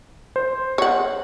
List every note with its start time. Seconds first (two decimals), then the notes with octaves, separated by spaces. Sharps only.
0.36 C5
0.78 C#5 F#5